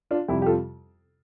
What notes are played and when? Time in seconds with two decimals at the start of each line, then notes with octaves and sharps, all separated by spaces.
0.11 D4 F4
0.28 F2 C3 G3 E4 G4
0.42 G4
0.46 F4 A4